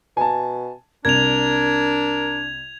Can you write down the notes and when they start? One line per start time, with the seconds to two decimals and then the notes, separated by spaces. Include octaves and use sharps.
0.17 B2 G#5 A5
1.05 C2 D4 A#4 G#6 F7